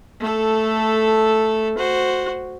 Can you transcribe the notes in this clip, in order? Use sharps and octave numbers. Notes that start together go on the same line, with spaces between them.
A3 A4
F#4 C5